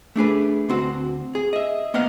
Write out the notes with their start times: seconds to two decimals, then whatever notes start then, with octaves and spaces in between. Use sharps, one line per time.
0.16 A3 D4 G#4 B4
0.69 D2 C4 F#4
1.35 G#4
1.53 D#5 E5
1.94 A#3 B3 D#5 F5 F#5